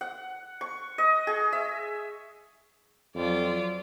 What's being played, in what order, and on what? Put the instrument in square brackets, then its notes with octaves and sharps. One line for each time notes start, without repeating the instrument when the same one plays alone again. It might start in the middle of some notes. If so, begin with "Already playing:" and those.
[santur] F#5
C#6
D#5
G#4
E5
[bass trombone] F2 [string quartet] F#3 F4 D5